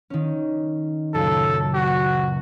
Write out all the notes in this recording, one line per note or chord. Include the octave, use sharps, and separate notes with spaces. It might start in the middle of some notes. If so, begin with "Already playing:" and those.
D#3 C#4
C#2 F#2 A#2 A4
F#4